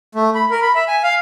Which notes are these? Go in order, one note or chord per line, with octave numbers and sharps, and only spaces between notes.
A3
B5
A#4
B5
E5
G#5
F5